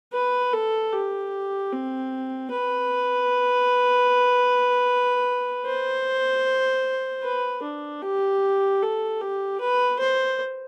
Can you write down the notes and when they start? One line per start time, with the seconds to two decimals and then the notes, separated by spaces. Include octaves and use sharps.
0.13 B4
0.53 A4
0.93 G4
1.72 C4
2.51 B4
5.66 C5
7.23 B4
7.63 D4
8.02 G4
8.82 A4
9.21 G4
9.60 B4
9.99 C5